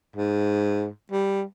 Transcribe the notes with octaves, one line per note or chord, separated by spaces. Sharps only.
G#2
G3